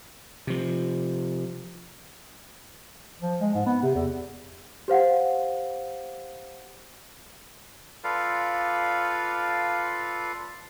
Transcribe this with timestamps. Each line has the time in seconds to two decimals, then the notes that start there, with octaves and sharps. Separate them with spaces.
0.47 C3 F3
3.22 F3
3.40 G#3
3.54 G#2
3.66 B3
3.83 C3
3.95 E2
4.88 G4 C5 F5 F#5
8.04 F4 A4 B4 D5 F5